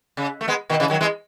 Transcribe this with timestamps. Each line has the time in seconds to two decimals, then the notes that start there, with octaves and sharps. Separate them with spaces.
0.17 C#3
0.41 A3
0.48 G#3 B3
0.69 B2 D#3
0.80 C#3 E3
0.90 D#3 F#3
1.01 E3 G#3